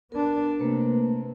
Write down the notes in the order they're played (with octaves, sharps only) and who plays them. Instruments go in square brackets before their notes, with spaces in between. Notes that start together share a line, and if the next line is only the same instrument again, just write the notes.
[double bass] B3 D4 [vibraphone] A#4
[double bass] C3 [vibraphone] A3 A#3 B4